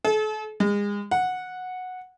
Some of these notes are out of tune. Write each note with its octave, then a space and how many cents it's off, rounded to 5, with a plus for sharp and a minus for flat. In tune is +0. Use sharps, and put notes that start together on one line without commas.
A4 -40
G#3 -30
F#5 -10